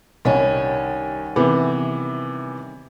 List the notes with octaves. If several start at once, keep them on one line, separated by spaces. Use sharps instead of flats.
C2 D#3 G3 C#4
C3 E3 B3